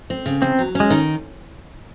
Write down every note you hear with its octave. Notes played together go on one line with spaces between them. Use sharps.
C4
C#3
E2 C4
F#3
C#4
G#3
D#3